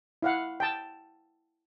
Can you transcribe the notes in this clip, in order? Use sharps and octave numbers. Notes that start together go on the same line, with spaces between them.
E4 F5 F#5
G5 A5